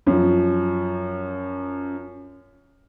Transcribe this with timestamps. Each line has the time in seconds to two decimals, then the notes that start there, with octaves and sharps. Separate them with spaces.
0.07 F#2 F3